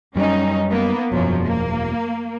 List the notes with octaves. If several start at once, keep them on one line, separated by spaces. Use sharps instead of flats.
F#2 G3 C#4 D#4
A#3 B3
E1 F#2 F3 F#3
A#3